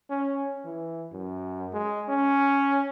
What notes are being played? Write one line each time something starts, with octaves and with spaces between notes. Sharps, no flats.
C#4
E3
F#2
G#3
C#4